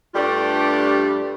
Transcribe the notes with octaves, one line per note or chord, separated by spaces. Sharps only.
G2 G3 A3 D4 F4